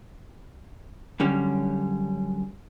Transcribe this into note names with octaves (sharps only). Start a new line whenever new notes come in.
F#2 D3 G3 C#4